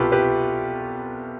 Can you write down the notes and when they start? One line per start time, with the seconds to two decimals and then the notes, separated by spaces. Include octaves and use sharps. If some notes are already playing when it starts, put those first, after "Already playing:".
Already playing: C2 B2 F4 G4 A4 B4
0.12 G4 B4